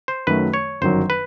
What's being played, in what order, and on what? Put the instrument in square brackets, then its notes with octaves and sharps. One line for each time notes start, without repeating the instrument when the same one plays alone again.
[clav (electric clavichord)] C5
[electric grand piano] F#2 D#3 F#3 A3 [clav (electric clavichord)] B4
[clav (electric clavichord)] C#5
[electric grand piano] G1 F#2 D#3 F#3 [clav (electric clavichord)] C5
[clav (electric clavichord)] B4